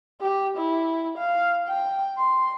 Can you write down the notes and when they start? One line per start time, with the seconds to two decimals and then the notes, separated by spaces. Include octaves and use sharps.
0.21 G4
0.57 E4
1.18 F5
1.68 G5
2.17 C6